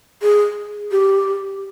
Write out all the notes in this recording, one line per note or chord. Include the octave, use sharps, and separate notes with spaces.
G#4
G4